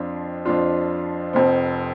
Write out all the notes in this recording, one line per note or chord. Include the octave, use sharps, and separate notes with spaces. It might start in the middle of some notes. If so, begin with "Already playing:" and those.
Already playing: F2 F3 D4 F4
F2 F3 D4 F4
F1 F2 F3 C4